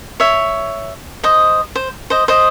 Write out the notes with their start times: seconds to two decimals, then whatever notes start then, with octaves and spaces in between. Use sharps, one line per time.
0.20 C#5 E5
1.23 C5 D#5
1.75 C5
2.10 C5 D#5
2.28 C5 D#5